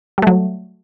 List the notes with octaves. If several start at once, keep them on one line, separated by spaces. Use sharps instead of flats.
F#3 G3 A3